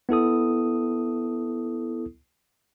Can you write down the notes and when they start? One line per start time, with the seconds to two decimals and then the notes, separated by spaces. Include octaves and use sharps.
0.09 B3 E4 A4 D#6